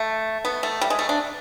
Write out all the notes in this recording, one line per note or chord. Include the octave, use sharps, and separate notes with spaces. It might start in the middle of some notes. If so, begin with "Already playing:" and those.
Already playing: A3
B3
A3
G3
G#3
A3
D4